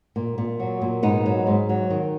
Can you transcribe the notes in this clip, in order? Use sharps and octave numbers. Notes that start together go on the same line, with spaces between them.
A#2
A#2
F#3
A#2
G#2 B3 D#4
F#3
G#2
F#3
D#3